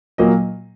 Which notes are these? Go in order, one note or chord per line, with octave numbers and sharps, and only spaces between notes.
A#2 F#3 A#3 D#5